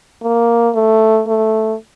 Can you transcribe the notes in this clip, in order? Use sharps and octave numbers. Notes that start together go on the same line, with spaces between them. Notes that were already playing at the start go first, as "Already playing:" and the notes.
A#3
A3
A3